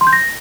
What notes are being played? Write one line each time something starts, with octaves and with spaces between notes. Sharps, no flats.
C6
G6
A#6